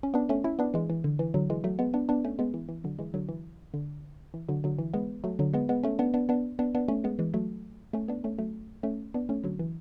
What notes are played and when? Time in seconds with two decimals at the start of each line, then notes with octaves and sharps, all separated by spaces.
0.03 C#4
0.14 B3 D4
0.29 A3 C#4
0.44 C#4 E4
0.59 B3 D4
0.74 E3 G#3
0.90 E3
1.04 D3
1.19 E3
1.34 D3 F#3
1.50 E3 G#3
1.64 F#3 A3
1.79 G#3 B3
1.94 B3 D4
2.09 B3 D4
2.25 A3 C#4
2.39 G#3 B3
2.54 E3
2.69 E3
2.84 D3 F#3
2.99 E3 G#3
3.14 D3 F#3
3.29 E3
3.74 D3
4.34 E3
4.49 D3 F#3
4.64 D3 F#3
4.79 E3
4.94 G#3 B3
5.24 F#3 A3
5.39 D3 F#3
5.53 G#3 B3
5.69 G#3 B3
5.83 A3 C#4
5.99 B3 D4
6.14 B3 D4
6.29 B3 D4
6.59 B3 D4
6.75 B3 D4
6.88 A3 C#4
7.04 G#3 B3
7.19 E3 G#3
7.34 F#3 A3
7.93 A3 C#4
8.08 B3 D4
8.24 A3 C#4
8.39 F#3 A3
8.83 A3 C#4
9.14 B3 D4
9.29 A3 C#4
9.44 D3 F#3
9.59 E3